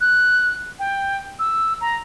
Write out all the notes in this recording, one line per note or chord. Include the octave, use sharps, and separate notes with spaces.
F#6
G5
E6
A#5